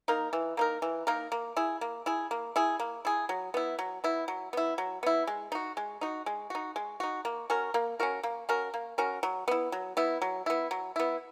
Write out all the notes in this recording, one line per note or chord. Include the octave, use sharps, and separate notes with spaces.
A#3 D#4 A#4
E3
A#3 D#4 A#4
E3
A#3 D#4 A#4
A#3
E4 G#4
A#3
E4 G#4
A#3
E4 G#4
A#3
E4 G#4
F#3
B3 E4
F#3
B3 E4
F#3
B3 E4
F#3
B3 E4
G#3
D#4 F#4
G#3
D#4 F#4
G#3
D#4 F#4
G#3
D#4 F#4
A#3
C#4 F#4 A#4
A#3
C#4 F#4 A#4
A#3
C#4 F#4 A#4
A#3
C#4 F#4 A#4
F#3
B3 E4
F#3
B3 E4
F#3
B3 E4
F#3
B3 E4